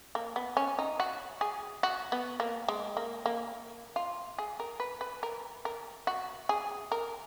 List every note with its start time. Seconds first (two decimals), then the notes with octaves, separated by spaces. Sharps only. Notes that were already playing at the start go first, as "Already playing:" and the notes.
0.15 A#3
0.36 B3
0.57 C#4
0.79 D#4
1.00 F#4
1.41 G#4
1.83 F#4
2.12 B3
2.40 A#3
2.68 G#3
2.97 A#3
3.26 A#3
3.96 F4
4.38 G#4
4.60 A#4
4.80 B4
5.01 B4
5.23 A#4
5.65 A#4
6.07 F#4
6.49 G#4
6.92 A#4